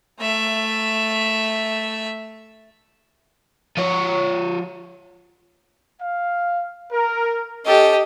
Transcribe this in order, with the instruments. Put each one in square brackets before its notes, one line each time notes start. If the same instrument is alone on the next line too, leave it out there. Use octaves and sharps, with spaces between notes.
[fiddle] A3 E5
[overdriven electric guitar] F3 C#5
[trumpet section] F5
A#4
[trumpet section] C#4 A4 [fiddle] G4 D#5